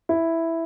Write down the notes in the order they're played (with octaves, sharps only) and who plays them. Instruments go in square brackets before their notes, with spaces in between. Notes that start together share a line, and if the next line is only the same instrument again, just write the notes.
[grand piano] E4